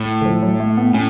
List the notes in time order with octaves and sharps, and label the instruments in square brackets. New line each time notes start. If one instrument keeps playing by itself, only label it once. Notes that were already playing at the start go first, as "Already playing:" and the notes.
Already playing: [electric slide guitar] A2
[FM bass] D3
F3
F#3
A3
B3
[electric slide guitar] A2 [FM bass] C#4